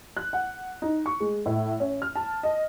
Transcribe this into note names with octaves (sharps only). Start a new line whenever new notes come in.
F#6
F#5
D#4
C#6
G#3
A2
C#4
F6
A5
D#5